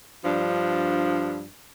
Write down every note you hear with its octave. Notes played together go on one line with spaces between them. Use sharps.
G2 F3 D4